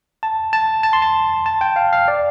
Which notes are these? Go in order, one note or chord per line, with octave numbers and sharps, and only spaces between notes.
A5
A5
A5
C6
A5
A5
G5
F5
F5
D5